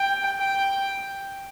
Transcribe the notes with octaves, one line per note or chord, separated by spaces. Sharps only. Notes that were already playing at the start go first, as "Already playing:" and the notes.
Already playing: G5
G5